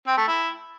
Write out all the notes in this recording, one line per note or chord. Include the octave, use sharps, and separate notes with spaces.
C4
A3
E4